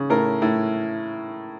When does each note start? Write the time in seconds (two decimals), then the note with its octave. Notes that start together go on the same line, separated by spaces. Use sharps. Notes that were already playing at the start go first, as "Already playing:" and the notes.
Already playing: C#3
0.10 A2 A#4
0.42 A2